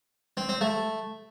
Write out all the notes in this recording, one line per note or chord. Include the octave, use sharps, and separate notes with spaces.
C4
C4
A3